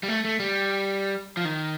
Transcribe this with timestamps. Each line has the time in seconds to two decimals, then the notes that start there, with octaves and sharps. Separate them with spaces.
0.03 G3
0.08 A3
0.25 A3
0.39 G3
1.37 F3
1.45 D#3